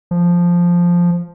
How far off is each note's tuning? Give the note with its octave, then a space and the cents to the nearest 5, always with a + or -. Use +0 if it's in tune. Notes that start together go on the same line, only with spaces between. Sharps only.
F3 +0